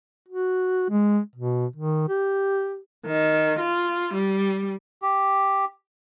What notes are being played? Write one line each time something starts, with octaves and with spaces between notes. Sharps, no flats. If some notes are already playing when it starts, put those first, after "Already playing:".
F#4
G#3
B2
D#3
G4
D#3
F4
G3
G4